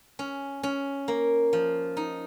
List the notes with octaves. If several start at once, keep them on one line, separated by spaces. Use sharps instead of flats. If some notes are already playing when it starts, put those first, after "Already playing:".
C#4
C#4
A#3
F3
D#4